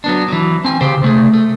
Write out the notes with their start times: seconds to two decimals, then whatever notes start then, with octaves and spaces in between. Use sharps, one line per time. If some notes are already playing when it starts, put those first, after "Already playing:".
0.04 F#3 B3 D4
0.28 E3 F#3
0.65 C4 G#5
0.81 C#3 G4 C5
1.02 C3 A3 G#4
1.34 A3